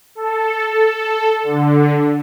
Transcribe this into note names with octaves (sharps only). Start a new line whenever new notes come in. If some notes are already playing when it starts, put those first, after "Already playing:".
A4
A4
D3